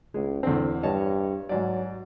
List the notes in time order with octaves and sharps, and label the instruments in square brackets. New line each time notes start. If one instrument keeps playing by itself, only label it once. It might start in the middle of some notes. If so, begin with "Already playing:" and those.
[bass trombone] C#2 [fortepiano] G#3
[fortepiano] E2 C4 [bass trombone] D3
[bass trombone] G2 [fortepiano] C#5 D#5 A5
[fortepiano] G#2 D5 [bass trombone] F#3